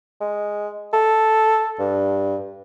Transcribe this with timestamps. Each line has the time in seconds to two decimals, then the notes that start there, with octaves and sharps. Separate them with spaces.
0.21 G#3
0.93 A4
1.79 G2